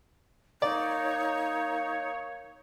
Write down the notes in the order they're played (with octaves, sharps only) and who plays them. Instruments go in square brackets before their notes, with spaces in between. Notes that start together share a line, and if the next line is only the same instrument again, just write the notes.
[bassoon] A#3 [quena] D#4 [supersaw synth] C#5 [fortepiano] D5